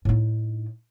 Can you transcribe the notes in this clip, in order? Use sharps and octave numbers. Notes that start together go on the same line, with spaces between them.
A2 D#4